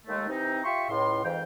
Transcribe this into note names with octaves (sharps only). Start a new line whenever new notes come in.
D#2 G#3 A3
C3 E3 C4 D#4
F4 G4 E5 C6 C#6
C#2 A2 C6
F2 G#2 E3 F5 G5